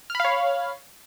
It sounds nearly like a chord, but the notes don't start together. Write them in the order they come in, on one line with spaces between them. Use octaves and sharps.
F6 B5 F5 C#5